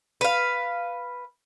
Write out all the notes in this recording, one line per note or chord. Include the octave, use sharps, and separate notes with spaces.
B4 F5